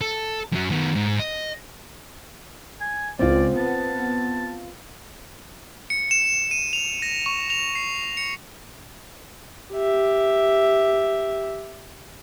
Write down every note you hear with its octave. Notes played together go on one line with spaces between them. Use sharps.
A4
F#2 F#3
D#3 B3
G#2
D#5
G#5
C#2 C4 F4 D5
B3 A5
C#7
E7
D#7
F7
A#6
C#6
F7
C7
C#7
G4 E5